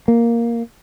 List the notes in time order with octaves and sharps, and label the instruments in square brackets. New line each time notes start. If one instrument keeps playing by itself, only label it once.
[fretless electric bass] A#3